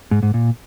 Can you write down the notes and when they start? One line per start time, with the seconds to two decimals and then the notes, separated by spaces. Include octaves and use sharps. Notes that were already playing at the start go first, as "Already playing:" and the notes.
0.11 G#2
0.23 G#2
0.34 A#2